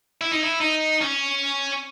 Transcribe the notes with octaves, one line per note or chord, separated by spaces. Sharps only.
E4
D#4
E4
D#4
C#4